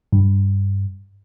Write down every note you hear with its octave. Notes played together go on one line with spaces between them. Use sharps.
G2